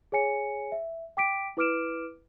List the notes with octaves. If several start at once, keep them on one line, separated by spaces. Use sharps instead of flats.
G#4 C#5 G#5 C#7
E5
G5 D6 B6 D7
E4 B4 D6 F6 D7 E7